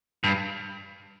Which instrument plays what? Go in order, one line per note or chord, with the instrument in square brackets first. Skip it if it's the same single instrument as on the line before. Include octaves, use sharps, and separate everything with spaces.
[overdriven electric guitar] G2